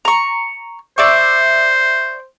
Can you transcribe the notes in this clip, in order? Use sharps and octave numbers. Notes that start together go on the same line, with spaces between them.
A#5 C#6
C5 D5 E5 C#6